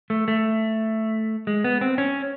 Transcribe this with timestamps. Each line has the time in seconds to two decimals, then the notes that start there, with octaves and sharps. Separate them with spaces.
0.10 A3
0.28 A3
1.47 G#3
1.64 B3
1.81 C4
1.98 C#4